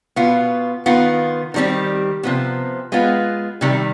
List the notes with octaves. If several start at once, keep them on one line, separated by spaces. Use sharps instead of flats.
B2 B3 F4
D#3 B3 F4
D#3 G3 C4 G4
C3 F3 B3
G#3 B3 F4 B4
C3 D#3 G3